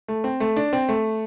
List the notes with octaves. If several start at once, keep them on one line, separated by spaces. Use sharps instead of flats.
A3
C4
A3
D4
C4
A3